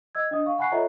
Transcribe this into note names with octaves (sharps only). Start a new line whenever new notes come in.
D#5 E6 G#6
D4 D#5 D#6
F5 C#6
F#5 G#5 B5 C#6 F#6 C7
F4 A4 C#5 D#5 E5 A#5